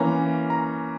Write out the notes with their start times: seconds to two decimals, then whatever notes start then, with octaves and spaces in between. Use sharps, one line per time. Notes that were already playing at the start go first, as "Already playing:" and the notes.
Already playing: E3 A#3 C#4 A#5
0.50 A#5